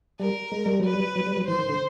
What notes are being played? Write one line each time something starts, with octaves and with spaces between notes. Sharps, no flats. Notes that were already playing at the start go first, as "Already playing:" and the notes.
G3 A#4
G#3
G3
F#3 B4
G3
F#3
G3
F#3
E3 C5
D#3
D3